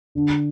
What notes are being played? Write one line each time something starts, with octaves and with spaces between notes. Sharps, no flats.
D3